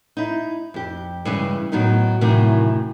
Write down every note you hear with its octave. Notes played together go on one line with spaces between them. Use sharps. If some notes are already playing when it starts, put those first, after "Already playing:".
D#4 E4
F2 G4
G2 C#3 E3 G#3
A2 D#3 F#3 B3 D#4
F#2 A2 C3 D#3 E3